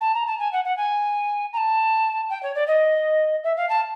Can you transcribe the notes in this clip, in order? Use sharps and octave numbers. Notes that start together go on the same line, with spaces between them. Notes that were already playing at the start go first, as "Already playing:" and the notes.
A5
A#5
A5
G#5
F#5
F#5
G#5
A#5
A5
G5
C#5
D5
D#5
E5
F5
A5